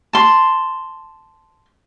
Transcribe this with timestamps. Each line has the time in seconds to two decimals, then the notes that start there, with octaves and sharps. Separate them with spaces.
0.13 A5 C6